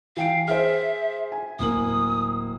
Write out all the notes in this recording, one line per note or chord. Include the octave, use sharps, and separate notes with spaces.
E3 F5 G5 D7
G#4 C5 E5 F6
G#5
D1 A#3 D#6 F#7